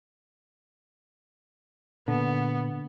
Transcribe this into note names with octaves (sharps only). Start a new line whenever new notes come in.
A#2 D3 B3